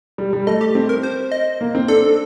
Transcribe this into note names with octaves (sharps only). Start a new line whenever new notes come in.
G3
G3
A3 D#5
G4
C4
A#4
C5
D#5
A#3
C4
D4 A4